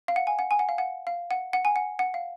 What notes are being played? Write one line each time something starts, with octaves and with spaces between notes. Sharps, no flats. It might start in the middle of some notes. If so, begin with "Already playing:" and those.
F5
F#5
G#5
F#5
G#5
F#5
F5
F#5
F5
F#5
F#5
G#5
F#5
F#5
F5